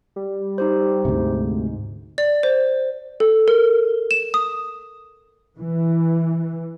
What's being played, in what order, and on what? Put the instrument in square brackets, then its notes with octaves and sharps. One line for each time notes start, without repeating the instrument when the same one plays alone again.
[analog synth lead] G3
[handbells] D#4 G4 C5
[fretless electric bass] D2 C3 [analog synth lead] G#2
[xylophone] D5
C5
A4
A#4
E7
D#6
[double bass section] E3